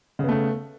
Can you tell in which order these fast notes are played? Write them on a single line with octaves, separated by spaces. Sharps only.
C#3 B3 A3